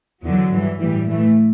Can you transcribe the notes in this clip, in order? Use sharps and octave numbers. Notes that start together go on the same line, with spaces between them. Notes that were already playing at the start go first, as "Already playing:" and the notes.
E2 D3 F#3
G2 E3
A2 E3 G3
A2 E3 A3